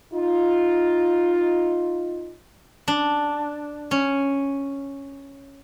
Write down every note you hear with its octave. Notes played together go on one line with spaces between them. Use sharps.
D#4 F4
D4
C#4